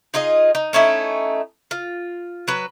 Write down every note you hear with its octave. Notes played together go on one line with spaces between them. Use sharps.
D#4 F4 G#4 D#5
D#4
A3 C#4 D#4 E4
F4
F#3 B4